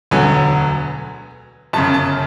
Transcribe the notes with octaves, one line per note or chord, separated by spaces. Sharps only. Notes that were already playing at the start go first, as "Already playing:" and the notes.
E1 D2 D3 F#3 B3 G#5
G1 F#2 C#3 A5
A5